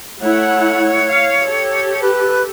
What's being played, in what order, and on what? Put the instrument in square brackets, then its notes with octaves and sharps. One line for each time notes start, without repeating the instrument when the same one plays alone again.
[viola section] A3 E4 F#5 [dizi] C#5
[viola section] F5
G4 A4
[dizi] B4